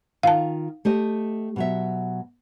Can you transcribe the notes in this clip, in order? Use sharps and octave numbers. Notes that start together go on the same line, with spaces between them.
D#3 F4 F5 A5
A3 G4 D#5
B2 F#3 E5